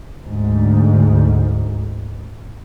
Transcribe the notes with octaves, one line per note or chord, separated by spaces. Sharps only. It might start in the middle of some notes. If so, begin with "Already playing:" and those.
D2 G#2